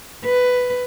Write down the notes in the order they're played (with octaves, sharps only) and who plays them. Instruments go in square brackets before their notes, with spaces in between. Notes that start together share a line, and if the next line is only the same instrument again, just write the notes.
[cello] B4